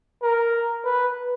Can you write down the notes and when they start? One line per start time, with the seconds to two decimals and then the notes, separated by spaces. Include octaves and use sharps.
0.22 A#4
0.85 B4